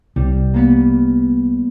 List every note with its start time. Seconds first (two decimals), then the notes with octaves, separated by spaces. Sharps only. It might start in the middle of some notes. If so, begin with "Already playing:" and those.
0.16 C2 G3
0.54 A#3 B3 B4